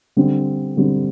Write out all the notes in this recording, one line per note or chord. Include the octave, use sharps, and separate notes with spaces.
D3 G3 C4
D3 G3 C4